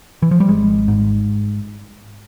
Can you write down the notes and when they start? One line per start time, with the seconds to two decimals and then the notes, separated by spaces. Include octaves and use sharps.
0.22 E3
0.31 F3
0.40 G3
0.48 G#1 G#3
0.88 G#2